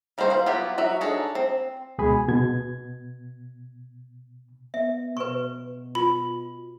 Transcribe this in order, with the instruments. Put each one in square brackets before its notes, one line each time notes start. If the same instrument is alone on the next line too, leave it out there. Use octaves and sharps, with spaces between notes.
[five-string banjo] D#3 G3 A#3 F#4 C5
C5 F5
F#3 B3 E4 F4 G4
F#3 F#4 E5
D4 D#4 G#4 A4 C#5
C4
[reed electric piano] D2 B2 G#3 G#4 G#5 B5
B2 G#6
[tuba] B3 [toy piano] E5
[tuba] B2 [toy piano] B4 C#6
[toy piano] F4 [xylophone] B5